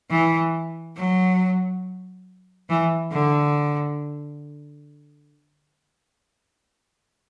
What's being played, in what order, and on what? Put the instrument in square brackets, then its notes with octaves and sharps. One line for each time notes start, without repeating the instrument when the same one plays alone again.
[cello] E3
F#3
E3
D3